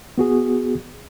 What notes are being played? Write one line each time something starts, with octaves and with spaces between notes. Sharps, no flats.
B3 F#4 G#4